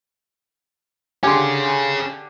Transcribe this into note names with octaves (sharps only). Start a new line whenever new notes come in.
D3 C#4 G4 G#4 G#5 C6